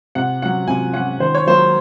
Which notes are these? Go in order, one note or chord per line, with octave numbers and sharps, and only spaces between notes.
C3 F#5
F#3 C#4 F#5
C3 G#5
F#3 C#4 F#5
D#3 C5
C#5
F#3 A#3 C5